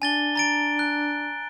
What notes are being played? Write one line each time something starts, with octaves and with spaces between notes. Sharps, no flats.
D4 G#5 A6 G7
A#5 A6 D7
F#6